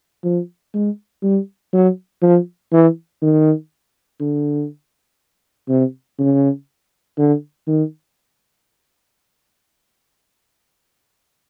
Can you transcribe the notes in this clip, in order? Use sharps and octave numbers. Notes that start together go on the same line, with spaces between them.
F3
G#3
G3
F#3
F3
E3
D#3
D3
C3
C#3
D3
D#3